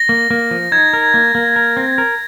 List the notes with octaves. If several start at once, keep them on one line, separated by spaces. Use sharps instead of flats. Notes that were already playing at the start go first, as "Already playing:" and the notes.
Already playing: A#6
A#3
A#3
F3
D#4 G#6
A#4
A#3
A#3
A#4
C4
A#4